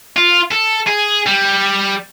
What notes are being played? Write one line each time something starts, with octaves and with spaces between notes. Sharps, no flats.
F4
A4
G#4
G3